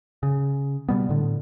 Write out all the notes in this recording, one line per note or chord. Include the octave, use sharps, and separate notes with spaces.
C#3
B2 G3 B3
A2 D3